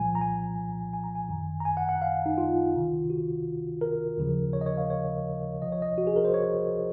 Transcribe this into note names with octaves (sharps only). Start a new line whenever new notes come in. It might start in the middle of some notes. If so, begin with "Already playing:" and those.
Already playing: C2 A#2 F3 G#5
A#5
G#5
G#5
A#5
G#5
G#1 F#2 D#3
A#5
G#5
F#5
F#5
F5
D#4
F4
C#2 C3 D#3
F#4
A#4
D#2 C#3 F3
C#5
D#5
C#5
F5
C#5
C#2 C3 F3 D#5
C#5
D#5
F#4
G#4
A#4
C5
C#5